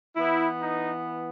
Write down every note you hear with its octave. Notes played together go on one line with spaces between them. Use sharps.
E3 B3 E4
D#4